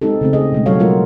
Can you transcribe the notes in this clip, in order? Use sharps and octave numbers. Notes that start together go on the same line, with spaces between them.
G#3 C4 D#4 G4 A4
C#3 A3 C4
G#4 D#5
B2 G#3 A3
F#3 G3 F#4 A4 C#5 F5
G#3 A3 F4 F#4 A#4